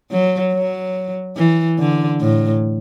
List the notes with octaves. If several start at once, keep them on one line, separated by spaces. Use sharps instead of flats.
F#3
F#3
E3
D3
A2